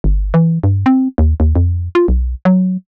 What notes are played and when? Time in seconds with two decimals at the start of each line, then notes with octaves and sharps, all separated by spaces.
0.04 G1
0.34 E3
0.63 G2
0.86 C4
1.18 D#2
1.40 D#2
1.55 F2
1.95 F4
2.08 B1
2.45 F#3